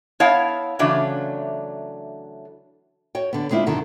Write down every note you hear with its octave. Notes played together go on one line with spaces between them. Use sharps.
B3 E4 C#5 F5 F#5 A5
C#3 E3 F#3 A3 D4
F#4 C#5 G5
D3 B3
G#3 C4 D4 E4 F4
G2 B2 D3 D#3